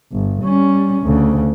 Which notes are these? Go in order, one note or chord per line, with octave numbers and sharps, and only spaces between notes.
G1
G3 C#4
D2 C#3